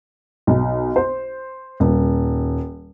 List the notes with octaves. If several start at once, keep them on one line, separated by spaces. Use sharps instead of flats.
B1
C5
D#1